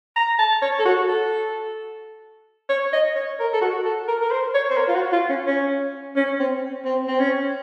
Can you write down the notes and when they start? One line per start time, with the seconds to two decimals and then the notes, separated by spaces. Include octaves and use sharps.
0.16 A#5
0.39 A5
0.62 C#5
0.79 A4
0.85 F#4
1.08 A4
2.70 C#5
2.93 D#5
3.15 C#5
3.40 A#4
3.53 A4
3.61 F#4
3.85 A4
4.08 A#4
4.22 A#4
4.31 C5
4.54 C#5
4.70 C5
4.77 A#4
4.88 F4
4.95 F#4
5.12 F4
5.29 C#4
5.47 C#4
6.16 C#4
6.39 C4
6.85 C4
7.08 C4
7.19 C#4